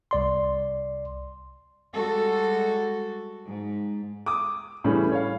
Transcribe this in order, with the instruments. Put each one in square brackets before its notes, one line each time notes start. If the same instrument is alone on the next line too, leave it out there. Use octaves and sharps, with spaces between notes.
[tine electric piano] C2 D5 C6
[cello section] G3 G#3 F#4 A4
G#2
[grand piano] D6 D#6
A2 C#3 E3 G3 C#4
C#5 F5